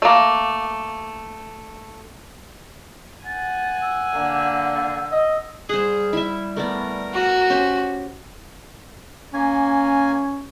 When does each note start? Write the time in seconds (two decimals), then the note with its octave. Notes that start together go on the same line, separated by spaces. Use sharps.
0.02 A3 A#3
3.26 F#5 G#5 A6
3.82 E6
4.14 D3 A#3
5.12 D#5
5.69 G3 G#4 C5 F#5
6.13 E4 E5
6.56 A3 B3 A#4 D5
7.13 F#4
7.50 C#4 G4 C5
9.34 A#3 C#4 G#5